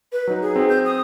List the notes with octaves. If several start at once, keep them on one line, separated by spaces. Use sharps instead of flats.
B4
F#3 D#4
G#4
C4
G6
D#6